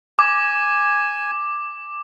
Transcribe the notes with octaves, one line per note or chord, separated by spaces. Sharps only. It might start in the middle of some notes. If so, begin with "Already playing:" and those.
G#5 D6